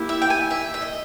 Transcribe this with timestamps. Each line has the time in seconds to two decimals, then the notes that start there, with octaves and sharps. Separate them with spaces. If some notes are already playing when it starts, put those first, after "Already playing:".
Already playing: A#3 E4 G4
0.09 E5
0.22 G5
0.30 G#5
0.51 E5
0.74 E5
0.82 D#5